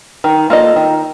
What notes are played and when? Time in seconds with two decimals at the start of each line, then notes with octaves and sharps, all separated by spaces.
0.24 D#3
0.50 A#3 F4 A4 D#5
0.76 D#3